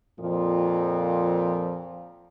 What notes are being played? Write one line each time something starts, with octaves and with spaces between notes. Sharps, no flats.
F2 A#2 F3